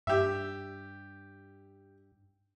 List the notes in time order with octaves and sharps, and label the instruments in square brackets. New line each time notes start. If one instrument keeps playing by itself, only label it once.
[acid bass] G2 [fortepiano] G4 E5